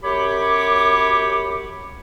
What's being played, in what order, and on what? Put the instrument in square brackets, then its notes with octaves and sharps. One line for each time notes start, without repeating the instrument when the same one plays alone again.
[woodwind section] F#2 G4 C#5 B5 D6